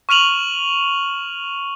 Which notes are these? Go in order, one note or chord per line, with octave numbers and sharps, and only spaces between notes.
C#6 F6 D#7 F7 F#7